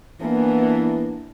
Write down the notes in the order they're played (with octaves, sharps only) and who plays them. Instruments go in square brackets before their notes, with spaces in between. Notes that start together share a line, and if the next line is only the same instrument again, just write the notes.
[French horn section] E3 B3 [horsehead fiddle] A#3 D4